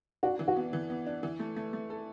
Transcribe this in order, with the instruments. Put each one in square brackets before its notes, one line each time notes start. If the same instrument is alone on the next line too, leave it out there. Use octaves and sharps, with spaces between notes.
[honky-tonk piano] D4 [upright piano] F#4
[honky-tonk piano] E3
[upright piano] F#4
[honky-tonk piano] B3
E3
B3
D4
E3
A3
A3
A3
A4